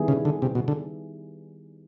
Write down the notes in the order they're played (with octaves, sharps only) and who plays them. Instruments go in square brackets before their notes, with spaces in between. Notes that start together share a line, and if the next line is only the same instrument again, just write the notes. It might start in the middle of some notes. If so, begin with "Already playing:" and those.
Already playing: [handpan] D#3 G3 B3 E4 G#4
[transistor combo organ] C#3
D3
C3
B2
D3